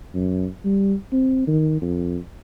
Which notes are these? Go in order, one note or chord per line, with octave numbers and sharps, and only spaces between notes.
F#2
G3
C4
D#3
F2